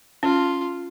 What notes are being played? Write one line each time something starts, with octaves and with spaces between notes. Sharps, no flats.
C#4 F4